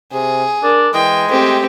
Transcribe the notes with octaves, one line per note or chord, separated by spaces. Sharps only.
C3 G#4
D4 A#4
E3 G#3 G5
A3 C4 G4